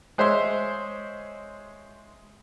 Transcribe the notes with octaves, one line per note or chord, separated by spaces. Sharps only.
G#3 C5 C#5 E5 C6